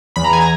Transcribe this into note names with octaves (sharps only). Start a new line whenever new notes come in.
E2 B5
A#5
G#5
A#5